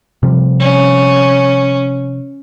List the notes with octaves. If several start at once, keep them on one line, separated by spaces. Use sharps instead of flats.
C3 F3 G3
C#4